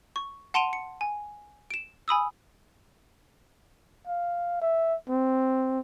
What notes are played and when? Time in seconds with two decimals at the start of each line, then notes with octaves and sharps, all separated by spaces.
0.16 C#6
0.54 F#5 A5 C6 D7 D#7 F7
0.73 C#7
1.01 G#5
1.71 D7 E7
2.08 G#5 B5 D#6 E6
4.07 F5
4.62 E5
5.09 C4